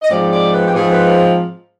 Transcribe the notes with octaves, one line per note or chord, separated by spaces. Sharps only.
D#5
G#2 F3 G#3 C4 D5
D5
B4
G4
G#2 F3 G#3 C4 G#4
B4